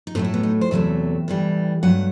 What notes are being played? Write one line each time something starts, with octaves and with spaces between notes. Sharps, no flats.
D#4
A2 F#3 A3 C4
E4
B3
D#4
C5
E2 C3 F#3 A3 E5
A2 E3 G3
G2 F#3 A3 F#5